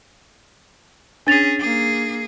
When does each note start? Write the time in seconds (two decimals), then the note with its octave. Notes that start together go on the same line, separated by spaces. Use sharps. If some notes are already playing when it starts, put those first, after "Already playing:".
1.27 C#4 D4 G#4 A6 F7
1.59 A#3 G#4